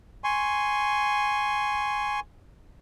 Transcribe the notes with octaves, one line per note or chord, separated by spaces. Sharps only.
G#5 C6 C#6